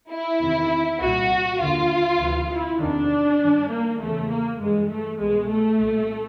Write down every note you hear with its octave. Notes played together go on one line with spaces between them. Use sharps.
E4
E2 C3 D#3
C2 A#2 F#4
D#2 D3 F4
D2 C3 E3
E4
E2 C3 D#3 D4
G2 D#3
A#3
E2 C#3 E3 A3
A#3
G2 E3 G#3
A3
C2 B2 G#3
A3
C2 A#2